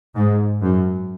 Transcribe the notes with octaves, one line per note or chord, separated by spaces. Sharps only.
G#2
F#2